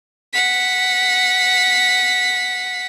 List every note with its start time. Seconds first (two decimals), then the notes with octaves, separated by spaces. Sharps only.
0.33 F#5 B6